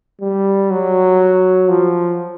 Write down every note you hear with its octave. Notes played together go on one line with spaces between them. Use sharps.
G3
F#3
F3